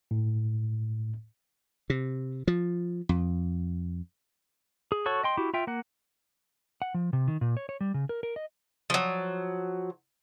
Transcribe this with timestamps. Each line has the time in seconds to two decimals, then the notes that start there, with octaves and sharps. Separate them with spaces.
0.11 A2
1.90 C3
2.48 F3
3.09 F2
4.92 G#4
5.06 F#4 A4 C#5 C#6
5.23 D#5 G5 C6
5.37 E4 F#4 G4
5.54 F4 E5 G5
5.67 A#3 F#5
6.82 F#5
6.94 F3
7.13 C3
7.28 D#3
7.41 A#2
7.57 C#5
7.69 C#5
7.81 G3
7.94 C#3
8.09 A#4
8.23 A#4
8.36 D#5
8.90 F3 F#3